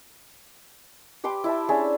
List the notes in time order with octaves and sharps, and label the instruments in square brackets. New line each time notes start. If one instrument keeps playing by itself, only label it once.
[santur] G4 B4 C6 D6
E4 E5 A5
C#4 D4 G#4 E5